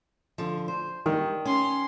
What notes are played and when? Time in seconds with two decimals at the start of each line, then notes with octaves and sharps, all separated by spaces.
0.38 D3 F3
0.68 C5
1.06 D#3 G3
1.45 C#4 C6